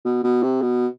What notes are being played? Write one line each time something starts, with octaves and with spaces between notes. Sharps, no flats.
B2
B2
C3
B2